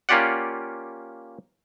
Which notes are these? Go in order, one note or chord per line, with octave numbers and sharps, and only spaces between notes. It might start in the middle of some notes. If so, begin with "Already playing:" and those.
A#3 C#4 F4 G4 D5 F#5